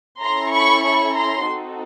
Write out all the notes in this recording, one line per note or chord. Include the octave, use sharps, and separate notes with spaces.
C#4 E4 A4 A#5 C6
B5 C#6
B5 C#6
A#5 C6
C4 D#4 F#4 A4